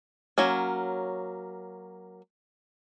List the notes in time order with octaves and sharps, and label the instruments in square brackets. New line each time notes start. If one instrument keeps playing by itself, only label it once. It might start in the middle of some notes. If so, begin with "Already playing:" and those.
[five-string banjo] F#3 A#3 C#4